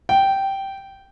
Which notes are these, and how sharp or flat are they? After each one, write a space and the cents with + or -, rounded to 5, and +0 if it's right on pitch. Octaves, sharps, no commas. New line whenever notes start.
G5 -10